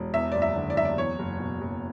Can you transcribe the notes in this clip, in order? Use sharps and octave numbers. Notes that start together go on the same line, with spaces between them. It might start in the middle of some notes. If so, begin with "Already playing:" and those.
Already playing: E1
E2 E5
F#1 D5
E5
D3
D5
F#1 E5
D5
E2 C#5
F#1
B2
F#1